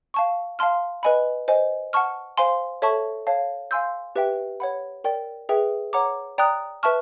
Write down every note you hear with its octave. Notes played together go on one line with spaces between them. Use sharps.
F5 A5 C#6
F5 A5 C6 F6
B4 D#5 G#5 B5
C5 D#5 G#5
F#5 A5 C#6 F6
C5 F5 G#5 C6
A4 C#5 E5 A5 C#6
C#5 F5 A5
F5 G#5 C6 E6 G6
G4 B4 E5 G5
C#5 F#5 B5
A#4 D5 G5
G#4 B4 E5 G5
C#5 F#5 A#5 D6
D5 G5 A#5 D#6 F#6
B4 E5 A5 C#6 F6